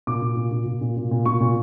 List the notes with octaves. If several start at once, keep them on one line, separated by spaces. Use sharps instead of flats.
A#2 D6
A#2
A#2
A#2
A#2
A#2
A#2
A#2
A#2 C#6
A#2